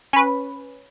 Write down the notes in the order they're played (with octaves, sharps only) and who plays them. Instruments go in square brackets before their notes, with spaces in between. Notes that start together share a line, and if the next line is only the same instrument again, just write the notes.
[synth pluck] C#4 B4